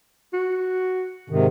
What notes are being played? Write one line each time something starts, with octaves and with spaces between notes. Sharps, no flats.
F#4
G#2 C3 D#3